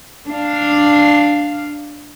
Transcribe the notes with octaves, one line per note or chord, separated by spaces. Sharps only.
D4 F5